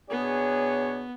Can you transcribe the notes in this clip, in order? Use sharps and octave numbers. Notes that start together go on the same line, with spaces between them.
B2 B3 D4 G#4 C#5